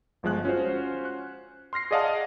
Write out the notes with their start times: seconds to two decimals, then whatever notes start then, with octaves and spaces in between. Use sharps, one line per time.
0.23 G1 F3 G#3 F#6
0.45 C#4 F4 F#4 C5
1.05 F#6
1.73 C6 F6 A#6 C7
1.91 G#4 D5 D#5 F5 F#5 A5